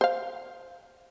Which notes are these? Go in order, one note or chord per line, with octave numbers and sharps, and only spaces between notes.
C5 F5